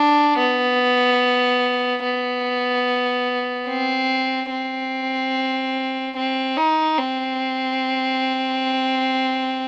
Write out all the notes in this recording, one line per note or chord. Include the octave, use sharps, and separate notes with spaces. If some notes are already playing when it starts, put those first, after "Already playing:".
Already playing: D4
B3
B3
C4
C4
C4
D#4
C4